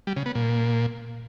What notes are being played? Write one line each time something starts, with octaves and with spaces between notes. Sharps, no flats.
G3
C#3
B3
A#2